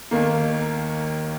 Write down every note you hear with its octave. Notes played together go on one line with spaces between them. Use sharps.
D#2 D#3 A#3